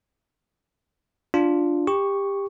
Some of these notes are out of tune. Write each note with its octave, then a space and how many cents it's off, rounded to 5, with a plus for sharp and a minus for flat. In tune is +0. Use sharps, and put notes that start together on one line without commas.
D4 +0 F4 +0
G4 +20 C#6 +0